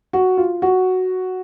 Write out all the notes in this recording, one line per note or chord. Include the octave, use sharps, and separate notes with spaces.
F#4
F4
F#4